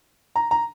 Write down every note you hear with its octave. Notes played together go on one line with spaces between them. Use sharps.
A#5
A#5